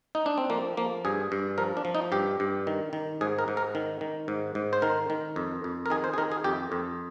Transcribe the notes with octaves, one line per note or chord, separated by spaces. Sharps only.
D#4
D4
C4
F3 A#3
F3 A#3
G2 G#4
G2
F3 A#4
D4
F3
D#4
G2 G4
G2
D#3
D#3
G#2 G#4
A#4
G#2
A#4
D#3
D#3
G#2
G#2
C5
D#3 A#4
D#3
F2
F2
A#4
D#3 G#4
C5
G#4
D#3 A#4
G#4
F2 G4
F2